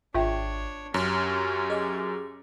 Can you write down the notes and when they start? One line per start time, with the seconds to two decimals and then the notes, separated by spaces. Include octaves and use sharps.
0.15 G#1 D4 F4 C#5 E5 G5
0.94 F#2 C#4 G4 C#5 A#5
1.70 G#4 D#5 D6